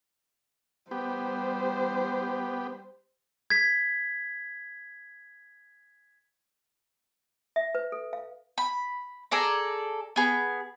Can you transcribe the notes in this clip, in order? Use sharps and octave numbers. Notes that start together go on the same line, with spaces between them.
G3 B3 G4 C5
G#6 B6
E5
B4
A4
F5
B5
G#4 A4 D5 A#5
B3 G#4